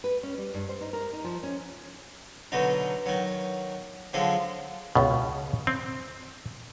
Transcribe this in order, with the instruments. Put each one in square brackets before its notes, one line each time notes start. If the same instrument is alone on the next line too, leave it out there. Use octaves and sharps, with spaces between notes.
[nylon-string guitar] B4
C#4
G3
G2
C5
D#4
A#4
D#4
F3
C#4
[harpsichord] B2 D3 F#3 D#4
D#3 F#3
D3 F3 F#3 G#3 A4
[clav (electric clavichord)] C#2 B2
C4